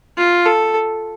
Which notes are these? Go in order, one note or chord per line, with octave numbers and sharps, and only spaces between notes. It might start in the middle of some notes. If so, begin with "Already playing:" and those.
F4
A4